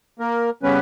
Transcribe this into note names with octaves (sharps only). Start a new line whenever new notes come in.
A#3 A#4
C#3 G3 B3 C#4 B4